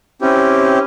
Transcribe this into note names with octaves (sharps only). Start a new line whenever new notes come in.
C4 C#4 E4 G4